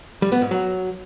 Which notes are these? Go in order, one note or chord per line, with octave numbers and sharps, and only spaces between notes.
G3
B3
G#2
F#3